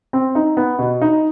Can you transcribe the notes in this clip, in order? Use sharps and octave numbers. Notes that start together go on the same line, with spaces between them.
C4
D#4
B3
B2
D#4